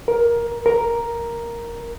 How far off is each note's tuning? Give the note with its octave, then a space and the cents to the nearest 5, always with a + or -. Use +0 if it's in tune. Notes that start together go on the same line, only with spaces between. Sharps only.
A#4 +15
A#4 +5